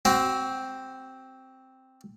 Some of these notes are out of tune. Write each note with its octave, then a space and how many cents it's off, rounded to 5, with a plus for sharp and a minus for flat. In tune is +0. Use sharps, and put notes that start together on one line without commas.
C4 +0 F#4 +30